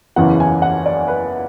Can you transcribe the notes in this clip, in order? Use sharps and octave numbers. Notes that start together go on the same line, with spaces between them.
F#1 E2 C#3 E3 F#5
G#5
F#5
D5
B4